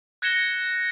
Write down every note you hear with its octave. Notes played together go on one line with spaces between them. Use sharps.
F#6 G#6 A#6 C#7 E7 G7